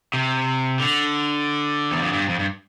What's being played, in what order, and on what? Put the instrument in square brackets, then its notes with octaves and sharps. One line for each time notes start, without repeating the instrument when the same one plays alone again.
[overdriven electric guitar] C3
D3
E2
F2
G2
F2
G2